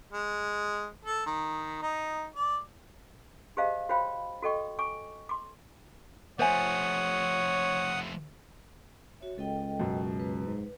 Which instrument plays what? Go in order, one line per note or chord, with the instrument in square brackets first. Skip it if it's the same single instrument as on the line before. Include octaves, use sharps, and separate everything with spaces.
[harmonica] G#3
A4
D#3
D#4
D5
[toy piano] G4 G#4 C5 D#5 F5 A5
F#4 C5 C#5 F5 G5 B5
F#4 A4 D#5 G5 C#6
G#5 C#6 D6
C6 D6
[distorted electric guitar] F3 A3 [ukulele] C5 E5 G#5 [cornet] C#5 [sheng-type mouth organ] F#5 D#6
[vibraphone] F#4 C#5 E5
[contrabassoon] C#2 [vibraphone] A4 D#5 G5
[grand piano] F#2 B2
[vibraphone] B4
[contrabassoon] G#2